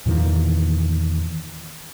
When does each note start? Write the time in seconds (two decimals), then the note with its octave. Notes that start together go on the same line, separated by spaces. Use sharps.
0.06 E2 A#2 D#3 E3